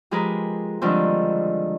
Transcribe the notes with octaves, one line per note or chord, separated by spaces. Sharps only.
F3 G#3 G4 G#4 A#4 B4
D3 D#3 F3 G3 G#3 C4